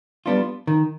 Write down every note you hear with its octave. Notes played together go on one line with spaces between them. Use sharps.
G3 B3 D4 F4
D#3